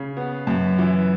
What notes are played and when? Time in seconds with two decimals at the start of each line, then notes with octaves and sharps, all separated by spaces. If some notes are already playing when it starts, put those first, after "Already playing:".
Already playing: C#3
0.17 B3
0.47 F#2
0.78 E3